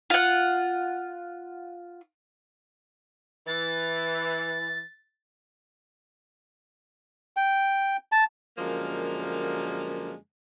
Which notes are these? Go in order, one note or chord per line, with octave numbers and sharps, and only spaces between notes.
F4 F#5
E3 A6
G5
A5
F#2 D3 F3 G#3 A#3